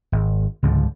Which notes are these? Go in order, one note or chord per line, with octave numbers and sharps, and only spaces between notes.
G#1
C#2 G#2 D3 F3